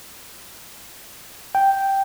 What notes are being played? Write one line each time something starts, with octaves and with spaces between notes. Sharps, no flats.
G5